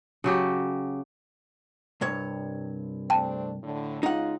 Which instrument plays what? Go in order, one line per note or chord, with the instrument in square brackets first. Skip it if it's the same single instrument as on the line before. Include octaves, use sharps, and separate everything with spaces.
[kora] C#3 F#3 G4
[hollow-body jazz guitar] C2 G2 C#5
[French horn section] A3 C4 D4 [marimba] G5 A5
[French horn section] A2 D3
[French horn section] C#3 G#3 F4 [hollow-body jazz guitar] D#4 F#5